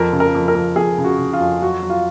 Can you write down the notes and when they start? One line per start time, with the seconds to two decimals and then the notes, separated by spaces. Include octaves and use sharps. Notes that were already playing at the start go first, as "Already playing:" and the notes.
Already playing: F2 A#4
0.13 C#3
0.20 A#4
0.35 F2
0.48 A#4
0.55 F2
0.76 F2 G#4
0.98 C#3
1.04 F#4
1.19 C#3
1.33 F4
1.40 F2
1.62 F#3 F#4
1.83 F#3
1.90 F4